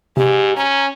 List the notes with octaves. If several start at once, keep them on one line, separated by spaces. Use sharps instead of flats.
G#2 C3 G4
C#4 A#5